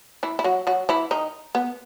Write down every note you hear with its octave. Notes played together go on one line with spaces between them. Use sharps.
E3 E4
E4
F#3 F#4
F#3 F#4
E3 E4
D#3 D#4
B3